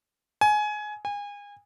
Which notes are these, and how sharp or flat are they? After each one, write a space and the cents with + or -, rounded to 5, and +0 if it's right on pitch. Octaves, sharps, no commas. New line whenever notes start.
G#5 +20
G#5 -30